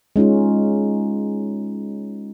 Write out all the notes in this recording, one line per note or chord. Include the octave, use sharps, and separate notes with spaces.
G#3 C#4 D#4 F4